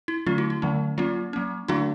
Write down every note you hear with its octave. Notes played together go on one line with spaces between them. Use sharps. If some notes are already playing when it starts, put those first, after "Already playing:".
E4
D3 F#3 A3 C#4 F4
E4 F#4
E4
D3 F#3 A3 C#4
F#3 A#3 C#4 F4
F#3 A#3 C#4
D3 F#3 A3 D4 E4 F#4